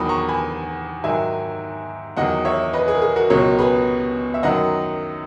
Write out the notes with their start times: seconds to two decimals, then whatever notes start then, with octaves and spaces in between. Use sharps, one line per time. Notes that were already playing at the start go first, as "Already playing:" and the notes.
Already playing: E2 D#3 F#3 B5 D#6
0.09 A#5 C#6
0.28 G#5 B5
1.04 G#2 D#3 F#3 E5 G#5
2.17 E2 D#3 F#3 D#5 F#5
2.45 C#5 E5
2.73 B4 D#5
2.88 G#4
2.95 A#4
3.02 G#4
3.16 F#4 A#4
3.30 C#2 B2 F#3 A#4 C#5
3.59 G#4 B4
4.34 E5
4.43 F#2 D#3 F#3 D#5 F#5